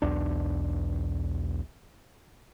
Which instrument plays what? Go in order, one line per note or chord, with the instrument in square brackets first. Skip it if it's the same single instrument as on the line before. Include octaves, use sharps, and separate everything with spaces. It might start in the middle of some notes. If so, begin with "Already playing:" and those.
[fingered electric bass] B1 E2 D4